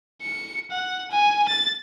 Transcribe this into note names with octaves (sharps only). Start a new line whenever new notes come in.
C#7
F#5
G#5
A6